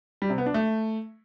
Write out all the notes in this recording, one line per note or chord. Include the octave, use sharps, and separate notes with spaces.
G3
C3
B3
D4
A3